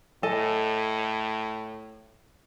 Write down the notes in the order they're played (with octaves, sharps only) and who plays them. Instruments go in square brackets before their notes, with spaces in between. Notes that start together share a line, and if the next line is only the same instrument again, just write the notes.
[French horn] A2 [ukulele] A4 D#5 G#5